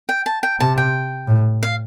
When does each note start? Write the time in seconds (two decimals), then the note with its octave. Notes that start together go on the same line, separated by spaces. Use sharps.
0.09 G5
0.26 A5
0.43 G5
0.60 C3 A5
0.78 G5
1.28 A2
1.63 F5